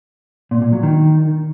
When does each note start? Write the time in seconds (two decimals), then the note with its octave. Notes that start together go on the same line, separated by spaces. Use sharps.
0.51 A#2
0.62 A#2
0.72 F#3
0.83 D#3